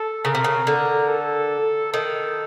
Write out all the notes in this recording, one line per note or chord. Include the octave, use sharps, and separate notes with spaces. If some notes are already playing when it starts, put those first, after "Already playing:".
Already playing: A4
C#3 A#4
C3
C#3
D3
A4
D#3 A4